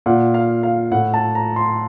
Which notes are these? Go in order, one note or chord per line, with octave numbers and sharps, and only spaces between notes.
A#2 F#5
F5
F5
A2 F#5
A5
A#5
C6